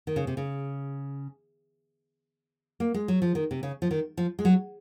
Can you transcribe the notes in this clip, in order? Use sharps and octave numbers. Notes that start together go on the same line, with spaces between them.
D#3
C#3
C3
C#3
A#3
G#3
F#3
F3
D#3
C3
C#3
F3
D#3
F3
G#3
F#3